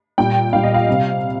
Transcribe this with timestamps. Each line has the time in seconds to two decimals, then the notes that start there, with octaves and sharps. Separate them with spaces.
0.18 A#2 G3 G5
0.53 A#2 G3 F5
0.63 D#5
0.74 F5
0.88 C3 G3